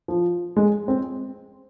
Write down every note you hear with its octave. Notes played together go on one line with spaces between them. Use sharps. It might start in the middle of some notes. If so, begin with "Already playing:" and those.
F3
G#3
C4